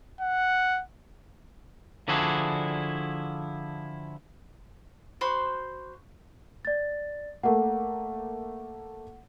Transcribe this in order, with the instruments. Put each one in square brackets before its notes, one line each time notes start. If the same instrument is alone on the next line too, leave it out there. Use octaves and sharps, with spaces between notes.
[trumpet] F#5
[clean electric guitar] D3 F3 D4 E4 F#4 G#4
[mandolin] F#4 C5 B5 C6
[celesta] D5 A6
[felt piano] A3 A#3 [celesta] F#5